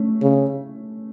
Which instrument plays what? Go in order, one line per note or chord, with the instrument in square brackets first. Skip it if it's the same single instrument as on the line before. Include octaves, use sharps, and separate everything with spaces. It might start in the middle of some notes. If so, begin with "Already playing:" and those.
Already playing: [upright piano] A3 C#4
[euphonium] C#3